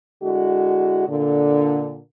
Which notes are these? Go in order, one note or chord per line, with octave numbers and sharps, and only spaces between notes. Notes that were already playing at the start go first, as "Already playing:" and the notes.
D3 G#3 E4 F#4
A#2 D3